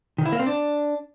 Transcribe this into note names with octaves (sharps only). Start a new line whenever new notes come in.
D#3
E4
A#3
C4
D4